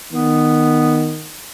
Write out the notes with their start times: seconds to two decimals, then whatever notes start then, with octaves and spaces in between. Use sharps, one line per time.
0.13 D#3 B3